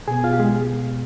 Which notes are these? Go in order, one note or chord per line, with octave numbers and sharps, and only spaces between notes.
B2 B3 G#4 G#5
F4 F5
G4
G#3 G#4